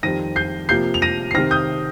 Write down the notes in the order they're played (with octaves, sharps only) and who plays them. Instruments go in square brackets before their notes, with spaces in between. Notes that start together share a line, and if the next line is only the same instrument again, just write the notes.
[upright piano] F2 D#3 G3 C4 A#6 D#7
G6 C7
C3 F3 A#3 G6 C7
F7
A#6 D#7
C7
C3 D#3 C4 F6 A#6
D#6 G6